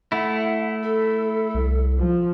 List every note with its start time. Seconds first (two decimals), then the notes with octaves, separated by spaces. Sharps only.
0.12 A3 E4 F#5
0.83 A4
1.55 C2
1.99 F3